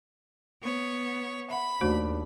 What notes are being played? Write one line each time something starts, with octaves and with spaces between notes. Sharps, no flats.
B3 C#5
E5 F#5 B5
D#2 A3 D4 F#4 C5